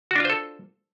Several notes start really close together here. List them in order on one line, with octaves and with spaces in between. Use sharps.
F#4 D4 F4 C5 A4